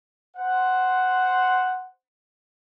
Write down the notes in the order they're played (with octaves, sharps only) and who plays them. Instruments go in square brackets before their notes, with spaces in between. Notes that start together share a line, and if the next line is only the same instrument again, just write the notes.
[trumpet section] C5 F#5